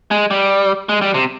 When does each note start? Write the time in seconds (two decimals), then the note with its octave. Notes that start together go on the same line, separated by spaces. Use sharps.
0.11 G#3
0.31 G3
0.89 G#3
1.02 G3
1.14 C3